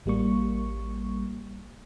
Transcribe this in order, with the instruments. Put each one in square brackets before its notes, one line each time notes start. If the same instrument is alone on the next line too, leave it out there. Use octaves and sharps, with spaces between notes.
[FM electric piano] A1 G3 A#3 C#6